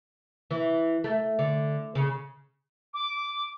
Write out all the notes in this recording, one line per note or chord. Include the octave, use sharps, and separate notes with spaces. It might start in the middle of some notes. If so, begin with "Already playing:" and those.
E3
A3
D3
C#3
D6